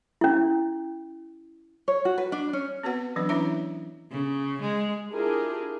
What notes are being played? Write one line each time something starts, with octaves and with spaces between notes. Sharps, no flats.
C#4 E4
C#5
F#4
B4
D4
C#4
B3 C4 F#4 B4 F#5
E3 F#3 D4 B4
C#4 D4 E4 C#5 E5 A#5
C#3
G#3
D4 E4 F4 G4 G#4 A#4